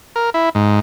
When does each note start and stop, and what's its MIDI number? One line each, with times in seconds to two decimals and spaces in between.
0.16 0.30 70
0.34 0.49 64
0.55 0.80 44